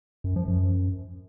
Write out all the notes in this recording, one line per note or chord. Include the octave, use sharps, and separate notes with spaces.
F#2
F3
F#2